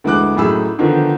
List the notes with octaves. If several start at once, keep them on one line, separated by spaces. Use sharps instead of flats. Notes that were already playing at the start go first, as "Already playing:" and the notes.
D2 E3 G#3 D6 F#6
F#2 A2 D#4 G#4 B5 E6
D3 D#3 F3 B3 D#4